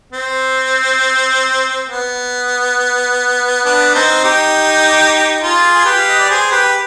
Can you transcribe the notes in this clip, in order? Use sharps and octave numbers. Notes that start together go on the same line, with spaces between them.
C4
B3
B3 D4
C4 D#4
D#4 G4
F4 G#4
G#4
G4 B4
F5
D#5
D5
G#4 C5
G4 B4